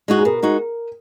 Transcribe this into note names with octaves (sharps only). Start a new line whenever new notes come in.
G#3 D#4 F#4
G#4
B2 A#4
G#3 D#4 F#4